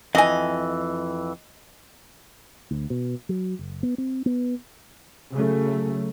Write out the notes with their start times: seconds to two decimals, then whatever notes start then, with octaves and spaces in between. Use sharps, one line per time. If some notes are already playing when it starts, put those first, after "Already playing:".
0.15 F2 E3 D#5 G#5
2.71 D2
2.90 B2
3.29 F#3
3.59 F#1
3.83 B3
3.98 C4
4.26 B3
5.34 C#3 F#3 A3